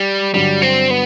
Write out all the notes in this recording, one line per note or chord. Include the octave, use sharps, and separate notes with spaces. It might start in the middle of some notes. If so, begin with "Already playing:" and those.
Already playing: G3
G2 D3 F#3 G3
C4
B3